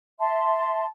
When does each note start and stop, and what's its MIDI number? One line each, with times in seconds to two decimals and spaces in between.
0.19 0.85 76
0.19 0.85 81
0.19 0.85 84